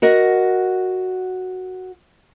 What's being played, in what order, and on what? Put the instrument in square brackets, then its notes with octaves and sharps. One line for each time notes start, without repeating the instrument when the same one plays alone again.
[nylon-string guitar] F#4 A#4 D#5 F#5